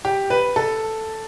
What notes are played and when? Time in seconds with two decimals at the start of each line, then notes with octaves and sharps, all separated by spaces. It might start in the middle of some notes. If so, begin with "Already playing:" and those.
0.05 G4
0.30 B4
0.56 A4